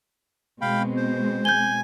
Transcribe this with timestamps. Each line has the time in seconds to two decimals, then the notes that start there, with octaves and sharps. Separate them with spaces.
0.61 B2 G#3 C4 F5 G5 B5
0.96 C5
1.45 G#5 G6 G7